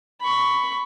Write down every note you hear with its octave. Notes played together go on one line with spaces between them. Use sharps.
B5 C#6